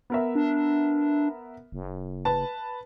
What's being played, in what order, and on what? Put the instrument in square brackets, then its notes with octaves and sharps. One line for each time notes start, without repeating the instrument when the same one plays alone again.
[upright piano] B3 A#4 E5
[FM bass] D4
F#1
[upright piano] B4 A5